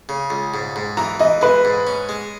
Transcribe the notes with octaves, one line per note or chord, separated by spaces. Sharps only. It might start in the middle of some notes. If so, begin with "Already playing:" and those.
C#3
C#2
G#2
G#2
E3 A#5
E3 D#5
G#3 B4
G#2
C#4
G#3